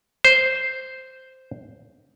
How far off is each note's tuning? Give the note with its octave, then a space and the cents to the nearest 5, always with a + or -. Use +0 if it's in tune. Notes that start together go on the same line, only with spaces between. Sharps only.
C5 -5